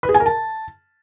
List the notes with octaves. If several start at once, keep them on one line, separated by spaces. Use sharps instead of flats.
B4
G#4
G#5
A#4
A5